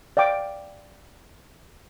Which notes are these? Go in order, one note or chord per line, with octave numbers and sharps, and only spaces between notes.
D5 F5 G5 D6